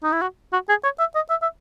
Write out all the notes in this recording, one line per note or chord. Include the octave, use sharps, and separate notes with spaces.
D#4
E4
F#4
F#4
G#4
C#5
E5
D#5
E5
E5